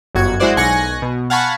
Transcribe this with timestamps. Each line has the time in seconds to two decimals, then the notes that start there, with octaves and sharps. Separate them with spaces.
0.15 G1 F#2 F#4 G#6
0.40 G#3 E4 F#4 C5 D5 F#5
0.57 B1 G#5 C#6 F#6 A#6 C#7
1.02 B2
1.30 F5 F#5 G#5 A5 B5 C#6